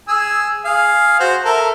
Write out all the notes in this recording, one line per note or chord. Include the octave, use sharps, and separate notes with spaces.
G#4 G#5 E6
G#4 F5
F#4 C5
A4 A#4 E5